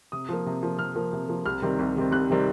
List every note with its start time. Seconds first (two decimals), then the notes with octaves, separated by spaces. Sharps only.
0.12 C3 D#6
0.29 F3 A#3
0.46 C3
0.63 F3 A#3
0.79 C3 F6
0.96 F3 A#3
1.13 C3
1.29 F3 A#3
1.45 C2 F6
1.62 C3 D#3 G3 C4
1.79 C2
1.96 C3 D#3 G3 C4
2.12 C2 F#6
2.30 C3 D#3 G3 C4